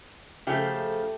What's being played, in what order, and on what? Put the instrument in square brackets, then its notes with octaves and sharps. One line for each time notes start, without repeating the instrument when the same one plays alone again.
[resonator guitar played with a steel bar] C#3 F3 A3 G4